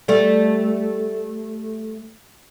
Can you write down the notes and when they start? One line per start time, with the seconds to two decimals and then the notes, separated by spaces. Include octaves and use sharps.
0.08 G3 A3